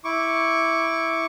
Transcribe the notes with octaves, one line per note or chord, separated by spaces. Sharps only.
E4 C#6 D6